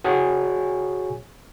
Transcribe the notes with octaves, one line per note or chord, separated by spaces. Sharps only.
F#4 G#4 C#5 G#5 C#6